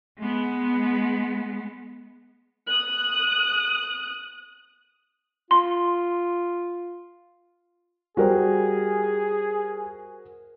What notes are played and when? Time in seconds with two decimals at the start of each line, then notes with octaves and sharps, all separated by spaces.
0.19 G#3 B3
2.66 D#6 F#6
5.51 F4 C6
8.17 G3 F#4 G#4 A#4 C5